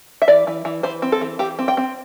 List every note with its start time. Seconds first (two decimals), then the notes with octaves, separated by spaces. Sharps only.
0.22 E5
0.28 E3 D5
0.47 E3
0.65 E3
0.83 E3 C5
1.02 C4
1.12 A4
1.21 E3
1.39 E3 G4
1.59 C4
1.68 G5
1.77 C4